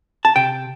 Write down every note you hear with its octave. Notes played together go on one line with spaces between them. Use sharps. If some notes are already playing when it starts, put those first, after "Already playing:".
A5
C3 G5